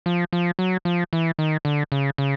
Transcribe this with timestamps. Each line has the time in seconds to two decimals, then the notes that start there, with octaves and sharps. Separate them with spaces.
0.06 F3
0.33 F3
0.59 F#3
0.85 F3
1.13 E3
1.39 D#3
1.65 D3
1.92 C#3
2.18 C#3